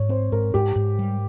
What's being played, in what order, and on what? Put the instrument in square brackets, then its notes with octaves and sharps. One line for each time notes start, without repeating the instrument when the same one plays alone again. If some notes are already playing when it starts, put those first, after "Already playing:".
Already playing: [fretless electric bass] G#2 [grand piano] C#5
[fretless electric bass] C4 [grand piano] C5
[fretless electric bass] G#2 [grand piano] A#4
[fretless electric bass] G#2 [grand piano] G4
[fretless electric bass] G#2
G3